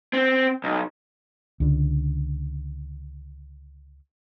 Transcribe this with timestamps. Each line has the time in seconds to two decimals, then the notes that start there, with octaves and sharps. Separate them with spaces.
0.13 C4
0.64 B1
1.60 C#2 D3